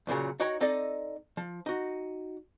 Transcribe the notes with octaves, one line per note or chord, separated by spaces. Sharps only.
F#2 A#2 C#3 F#3
D#4 F#4 C#5 G5 A#5
C4 D#4 A4 D5 D#5
F3
D#4 F#4